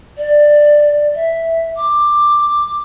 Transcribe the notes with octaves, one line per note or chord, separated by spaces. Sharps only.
D5
E5
D6